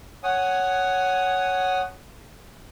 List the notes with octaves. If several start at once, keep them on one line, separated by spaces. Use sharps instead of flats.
C#5 F#5 G#5 D#6